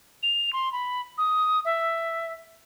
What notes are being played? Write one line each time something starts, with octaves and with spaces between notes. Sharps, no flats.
F7
C6
B5
D#6
E5